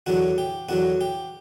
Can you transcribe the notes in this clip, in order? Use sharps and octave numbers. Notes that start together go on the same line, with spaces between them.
E2 D3 F#3 F#4
G4
E2 D3 F#3 F#4
G4